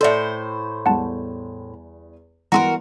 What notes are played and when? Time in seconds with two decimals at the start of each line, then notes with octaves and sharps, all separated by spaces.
0.01 A2 A4 C5 D5 E5
0.86 E2 G3 F#5 A5
2.52 E3 G3 B3 F#4 G#4 A#4 A#5 C6